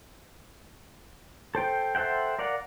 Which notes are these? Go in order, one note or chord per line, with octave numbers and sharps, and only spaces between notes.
A4 C5 G5
A4 C5 E5 F#5 G5
A#4 D5 F5 F#5